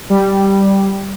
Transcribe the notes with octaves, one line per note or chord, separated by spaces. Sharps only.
G3